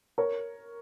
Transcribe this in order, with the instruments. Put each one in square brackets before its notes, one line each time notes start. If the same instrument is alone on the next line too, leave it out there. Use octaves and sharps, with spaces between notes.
[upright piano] A#4 C#5